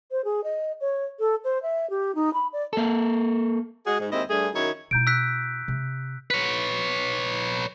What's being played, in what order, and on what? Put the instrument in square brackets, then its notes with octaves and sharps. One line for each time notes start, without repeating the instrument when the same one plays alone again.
[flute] C5
G#4
D#5
C#5
A4
C5
E5
G4
D#4
B5
D5
[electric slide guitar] A#3 A4
[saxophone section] G#3 F#4 G#4
G#2
D#2 G#3 C4 E4 D#5
G2 G3 A3 G#4
F#2 D#3 D#4 E4 C#5
[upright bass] B2 E4 [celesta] A#5 G6 D7
[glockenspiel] E6 F#6 B6
[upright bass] C3
[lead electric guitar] B4 C#5